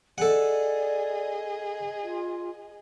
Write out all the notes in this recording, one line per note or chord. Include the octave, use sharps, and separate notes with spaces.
G#4 A4 D5 D#5 F#5
F4